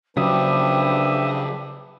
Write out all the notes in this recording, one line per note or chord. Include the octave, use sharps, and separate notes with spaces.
C#3 F3 F#3 D4 G4 B4 E5 D#6